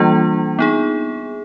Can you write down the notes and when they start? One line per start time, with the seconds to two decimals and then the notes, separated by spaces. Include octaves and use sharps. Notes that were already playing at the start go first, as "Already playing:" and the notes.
Already playing: E3 G3 A#3 D4 F4
0.59 B3 D#4 G#4